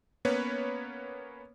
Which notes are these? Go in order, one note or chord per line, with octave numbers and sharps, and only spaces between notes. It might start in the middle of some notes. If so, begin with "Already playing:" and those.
A#3 B3 C#4 B4 C#5